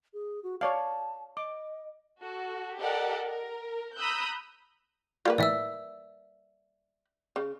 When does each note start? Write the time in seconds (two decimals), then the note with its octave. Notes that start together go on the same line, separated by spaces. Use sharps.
0.14 G#4
0.43 F#4
0.61 C#5 D5 F5 A5
1.37 D#5 D6
2.21 F#4 A4
2.78 G4 A4 A#4 D5 D#5 F#5
3.25 A#4
3.97 A#5 B5 D#6 E6 F#6 G6
5.25 G3 A#3 F4 B4
5.38 A2 E3 D5 E5 E6
7.36 C#3